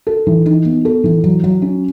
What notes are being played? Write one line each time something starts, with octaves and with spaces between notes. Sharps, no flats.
A4
E3
D#4
B3
A4
E3
F#3
F#3
C#4